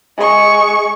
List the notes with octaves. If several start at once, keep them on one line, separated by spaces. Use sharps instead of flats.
G#3 C#6